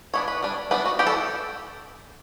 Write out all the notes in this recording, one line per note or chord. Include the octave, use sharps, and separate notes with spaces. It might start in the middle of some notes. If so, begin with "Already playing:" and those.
E3 B3 D4 C#5
B4
G3 D4
G3 B3 D4 B4
F#4
E3 B3 D4 G4
A4